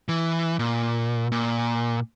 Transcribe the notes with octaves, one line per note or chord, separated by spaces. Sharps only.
E3
A#2
A#2